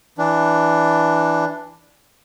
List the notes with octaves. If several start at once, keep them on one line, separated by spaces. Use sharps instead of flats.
E3 D4